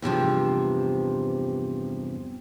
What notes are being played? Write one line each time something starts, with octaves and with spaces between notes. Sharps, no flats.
E2 G2 C3 F3